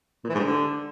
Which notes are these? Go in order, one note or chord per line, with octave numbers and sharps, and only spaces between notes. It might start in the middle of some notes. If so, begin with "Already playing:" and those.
A#2
E3
G#2
G2
D3